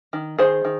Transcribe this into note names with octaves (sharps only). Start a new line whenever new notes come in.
D#3
D#3 G#4 C5
D#3